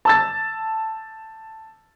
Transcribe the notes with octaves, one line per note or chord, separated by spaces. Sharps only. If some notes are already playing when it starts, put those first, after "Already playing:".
A5 E6 A6